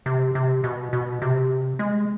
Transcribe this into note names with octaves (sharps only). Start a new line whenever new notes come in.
C3
C3
B2
B2
C3
G#3